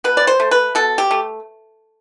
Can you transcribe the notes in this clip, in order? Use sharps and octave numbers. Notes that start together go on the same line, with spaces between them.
B2 B4
D5
C5
A3
B4
B2 A4
G4
A3